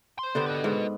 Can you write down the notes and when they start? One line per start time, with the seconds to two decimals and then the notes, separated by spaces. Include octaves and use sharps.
0.19 C5 C6
0.35 D3 B3 G4
0.46 B4 D#5
0.64 G#2